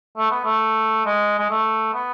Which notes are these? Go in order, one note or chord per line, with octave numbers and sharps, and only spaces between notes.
A3
B3
A3
G#3
G#3
A3
B3